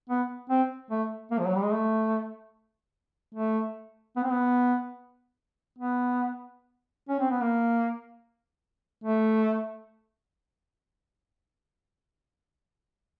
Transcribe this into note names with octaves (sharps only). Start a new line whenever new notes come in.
B3
C4
A3
A#3
F3
F#3
G3
G#3
A3
A3
B3
C4
B3
B3
C#4
C4
B3
A#3
A3